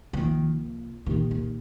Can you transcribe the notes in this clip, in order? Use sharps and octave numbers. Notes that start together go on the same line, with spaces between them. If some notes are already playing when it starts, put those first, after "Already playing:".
C2 C3 D#3 F3 A#3 F4
C2 A#2 D#3 A#3 D#4 G4
D#3